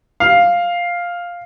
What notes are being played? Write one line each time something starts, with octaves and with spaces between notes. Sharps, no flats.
F5